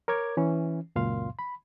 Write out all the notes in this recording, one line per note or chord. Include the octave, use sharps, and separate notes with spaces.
A#4 C#5 D6 G#6
E3 C#4
C#2 F#2 A#2 F5 C6
B5